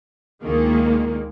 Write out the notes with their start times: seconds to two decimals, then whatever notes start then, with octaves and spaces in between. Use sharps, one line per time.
0.43 D2 A#2 D#3 G#3 A#3